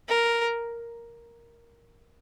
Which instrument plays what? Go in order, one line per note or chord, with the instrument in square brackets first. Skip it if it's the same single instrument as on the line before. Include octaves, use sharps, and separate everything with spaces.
[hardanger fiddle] A#4